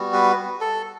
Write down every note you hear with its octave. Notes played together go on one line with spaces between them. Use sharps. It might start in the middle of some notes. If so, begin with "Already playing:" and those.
Already playing: G3 B3 F#4
B4
A4